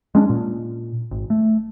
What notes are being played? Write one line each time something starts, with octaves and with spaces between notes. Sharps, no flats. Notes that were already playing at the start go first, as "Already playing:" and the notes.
G#3 C#4 D4
A#2
G#1
A3